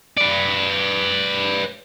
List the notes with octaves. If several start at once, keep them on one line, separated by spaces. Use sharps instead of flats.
B4 D5